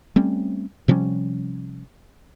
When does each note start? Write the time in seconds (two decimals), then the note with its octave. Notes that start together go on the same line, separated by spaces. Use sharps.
0.16 G3 A3 C4 C#4
0.88 C3 F3 G3 C#4